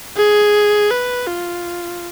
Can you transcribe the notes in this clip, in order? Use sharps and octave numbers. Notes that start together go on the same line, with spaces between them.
G#4
B4
F4